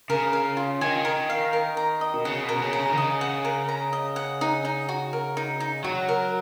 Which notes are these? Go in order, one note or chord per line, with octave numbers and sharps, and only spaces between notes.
C#3 A#4
F5
F4
D#3 G#5
A#4
F5
A#4
A#5
D#5
B2
C#3 F#5
B2
A#4
C#3
A#5
C#3
D#3
C#3 D#5
F#5
A#4
A#5
D#5
F#5
D#4
D#4
F#4
A#4
D#4
D#4
F#3 F#4
A#4